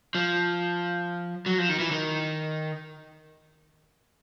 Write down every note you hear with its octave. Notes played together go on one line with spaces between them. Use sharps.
F3
F#3
F3
D#3
E3
D#3